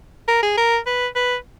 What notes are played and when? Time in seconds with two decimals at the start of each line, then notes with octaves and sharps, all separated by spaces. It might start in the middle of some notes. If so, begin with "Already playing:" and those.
0.28 A#4
0.43 G#4
0.57 A#4
0.87 B4
1.15 B4